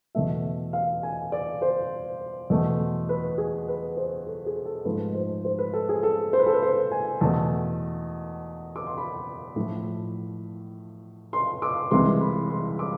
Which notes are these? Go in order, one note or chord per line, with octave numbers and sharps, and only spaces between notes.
E2 B2 A3 E5
F5
G#5
D5
C5
E2 B2 A3
B4
G#4
B4
C5
A4
G#4
A4
G#2 F3 A3 B4
C5
C5
B4
A4
G#4
A4
C5
B4
A4
B4
C5
G#5
E2 B2 A3 A5
D6
C6
B5
A2 F3 A3
C6
D6
C2 C3 E3 G#3 C6
B5
C6
D6